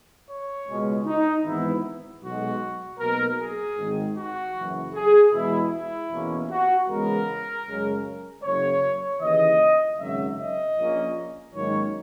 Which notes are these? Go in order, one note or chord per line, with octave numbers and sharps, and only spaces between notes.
C#5
C#2 B2 G#3 C#4
D#4
G#1 G#2 E3 B3 E4
B1 B2 G#3 F#4
B1 B2 A#3 A#4
G#4
G#1 G#2 D#3
F#4
F#1 F#2 E3
G#4
E2 B2 G#3 E4
E4
E2 B2 A#3 C#4
F#4
E2 C#3 G#3 B3 A#4
F#2 C#3 G#3 C#4
F#1 F#2 C#3 C#5
D#2 C#3 E3 D#5
G#1 F#2 C#3 F#3 E5
D#5
A#1 A#2 A#3 C#4
G#2 D#3 F#3 A#3 C#4 C#5